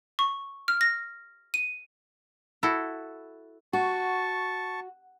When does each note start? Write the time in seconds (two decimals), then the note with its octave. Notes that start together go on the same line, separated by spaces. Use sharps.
0.19 C#6
0.68 F6
0.81 A#6
1.54 D#7
2.63 E4 F#4 A4
3.73 F#4 A5 C#6